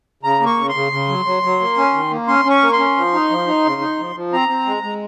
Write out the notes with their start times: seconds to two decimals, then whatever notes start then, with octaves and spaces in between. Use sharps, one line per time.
0.23 C#3 A#5
0.40 A#3
0.46 C#6
0.57 C#3
0.69 C6
0.75 C#3
0.92 C#3
1.09 F#3
1.26 F#3
1.43 F#3
1.60 A#3
1.77 C#4
1.93 D#3
2.11 A#3
2.28 C#4 C6
2.45 C#4
2.50 C#6
2.62 A#3
2.73 C6
2.79 C#4
2.96 F3
3.14 D#4
3.30 F3
3.47 D#4
3.64 C#3
3.81 D#4
3.98 F3
4.16 F3
4.33 C4 A#5
4.49 C4
4.66 G#3
4.83 G#3